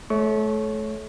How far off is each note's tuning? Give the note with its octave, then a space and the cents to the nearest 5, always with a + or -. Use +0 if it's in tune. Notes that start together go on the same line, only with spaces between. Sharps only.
A3 -30 C#5 +0 C#6 +10